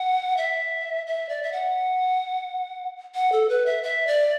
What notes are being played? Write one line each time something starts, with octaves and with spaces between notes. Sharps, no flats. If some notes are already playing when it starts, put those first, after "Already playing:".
Already playing: F#5
E5
E5
D5
E5
F#5
F#5
A4
B4
E5
E5
D5